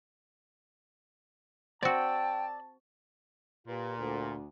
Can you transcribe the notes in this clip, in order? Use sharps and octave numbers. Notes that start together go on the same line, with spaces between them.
C4 F#4 D5 G5 A5 E6
A#2 F4 G4 B4
D2